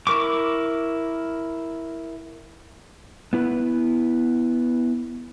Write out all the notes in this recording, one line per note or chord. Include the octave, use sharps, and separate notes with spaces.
E4 A#4 C#6 D6
B3 E4 B4